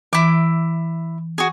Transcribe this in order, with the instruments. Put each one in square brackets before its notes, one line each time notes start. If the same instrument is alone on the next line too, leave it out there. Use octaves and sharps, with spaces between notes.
[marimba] E3 [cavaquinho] E4 D6
[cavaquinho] F#4 G#4